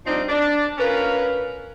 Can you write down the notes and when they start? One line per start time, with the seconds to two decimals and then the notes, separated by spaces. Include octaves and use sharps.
0.06 F3 G3 C4 D4 D#4
0.29 D4
0.78 C#4 F4 A#4 B4